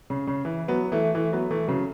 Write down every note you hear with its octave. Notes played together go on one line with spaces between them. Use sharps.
C#3
C#3
E3
F#3 B3
E3 A3
E3 A3
F#3 B3
E3 A3
C#3 F#3